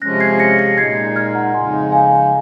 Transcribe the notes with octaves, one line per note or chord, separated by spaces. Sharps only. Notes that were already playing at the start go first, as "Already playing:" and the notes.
C3 F3 G#3 C#4 F#6 A#6
G#6 C7
A#6 C#7
A#6 C#7
A#2 G#3 D#4 G#6 C7
F6 G#6
F#5 A#5
F2 C#3 G#3 D#4 G#5 C6
F5 G#5